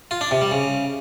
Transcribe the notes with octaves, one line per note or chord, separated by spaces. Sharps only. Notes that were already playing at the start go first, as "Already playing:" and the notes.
F4
D4
C3
G3
C#3